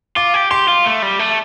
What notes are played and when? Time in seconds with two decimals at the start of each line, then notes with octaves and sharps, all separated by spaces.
0.16 F4 D6
0.34 G4
0.51 G4 C6
0.68 F4
0.86 A3
1.02 G3
1.19 A3